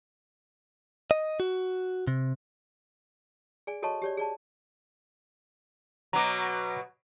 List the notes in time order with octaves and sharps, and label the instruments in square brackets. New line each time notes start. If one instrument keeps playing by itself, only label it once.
[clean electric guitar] D#5
F#4
C3
[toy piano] G#4 D5 G#5
F#4 A4 C#5 D#5 A5 C#6
G4 C#5 D5
G#4 D5 A5
[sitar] B2 F#3 [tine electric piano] A#5 D6